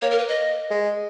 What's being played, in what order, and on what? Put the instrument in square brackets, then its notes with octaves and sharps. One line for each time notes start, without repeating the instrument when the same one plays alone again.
[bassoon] A#3 [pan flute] C#5
[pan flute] A#4
B4
D#5
[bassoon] G#3